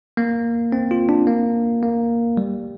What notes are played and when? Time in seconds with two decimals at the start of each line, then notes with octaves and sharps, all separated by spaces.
0.17 A#3
0.72 C4
0.91 F4
1.09 D4
1.27 A#3
1.83 A#3
2.37 G3